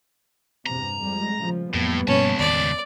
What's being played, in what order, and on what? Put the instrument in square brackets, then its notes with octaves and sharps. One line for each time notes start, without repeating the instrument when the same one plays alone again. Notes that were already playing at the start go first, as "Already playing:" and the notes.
[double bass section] E2 G2 C3 [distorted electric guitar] A#5
[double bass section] F2 G3 G#3
A#2 C#3 F3
[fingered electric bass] F2 F#3 [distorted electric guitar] A2 [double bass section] G3 A#3 B3
[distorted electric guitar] C#2 A5 [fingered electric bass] G2 B2 F3 [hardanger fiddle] C#4
[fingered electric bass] A1 E2 D#3 [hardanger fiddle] D5